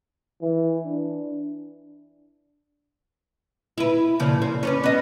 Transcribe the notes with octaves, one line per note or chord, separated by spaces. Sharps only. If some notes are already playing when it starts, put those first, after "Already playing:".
E3
D4
E4 B4
A#2 C#3 F3
C4
C#4 D4 B4
B3 D#5